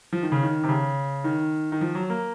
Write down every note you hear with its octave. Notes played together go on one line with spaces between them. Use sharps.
F3
D#3
C#3
D#3
C3
C#3
D#3
D#3
F3
F#3
A#3